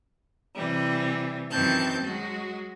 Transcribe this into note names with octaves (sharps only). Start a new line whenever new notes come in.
C3 E3 G3
F#2 D#3 E3 C4 A5 G6
F#3 G#3 F#4